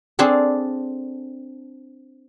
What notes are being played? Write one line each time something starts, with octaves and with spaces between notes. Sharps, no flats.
C4 D4 G#4 A4